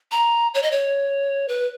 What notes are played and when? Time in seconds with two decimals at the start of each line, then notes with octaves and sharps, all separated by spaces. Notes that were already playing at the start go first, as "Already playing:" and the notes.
0.12 A#5
0.54 C#5
0.63 D#5
0.71 C#5
1.49 B4